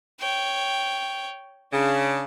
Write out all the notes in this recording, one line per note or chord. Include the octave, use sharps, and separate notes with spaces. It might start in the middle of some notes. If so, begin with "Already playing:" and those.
C#5 G5
C#3 D4